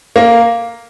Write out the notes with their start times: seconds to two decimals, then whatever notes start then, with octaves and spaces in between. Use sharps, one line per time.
0.16 A#3